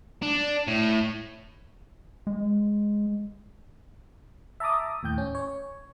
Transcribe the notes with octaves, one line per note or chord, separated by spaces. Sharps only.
D4
A2
G#3
E5 A5 A#5 D6 D#6
D#2 A2 G5 G6
C#4
C#5